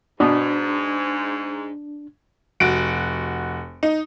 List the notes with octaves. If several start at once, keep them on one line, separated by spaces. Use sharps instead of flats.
G#2 B2 D4
F1 F#4 D7
D#4